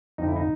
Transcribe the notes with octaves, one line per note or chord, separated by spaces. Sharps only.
F2 D3 F3 D#4
E4
D#4